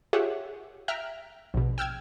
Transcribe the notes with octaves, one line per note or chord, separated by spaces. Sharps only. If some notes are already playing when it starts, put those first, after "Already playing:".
F4 G4 G#4 C#5 E5 F#5
E5 G5 A#5 F6 F#6
A#1 B2
G5 E6 F6 G#6